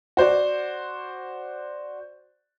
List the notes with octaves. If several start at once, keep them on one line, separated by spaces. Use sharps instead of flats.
F#4 C5 D5